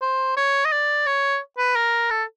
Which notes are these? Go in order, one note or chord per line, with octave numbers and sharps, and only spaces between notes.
C5
C#5
D#5
D5
C#5
B4
A#4
A4